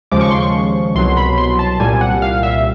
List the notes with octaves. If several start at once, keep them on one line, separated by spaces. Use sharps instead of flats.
D#2 C#3 F3 G#3 D6
C#6
C6
C#6
C2 B2 F#3 C6
B5
C6
A5
C2 A#2 G3 G#5
F#5
F5
E5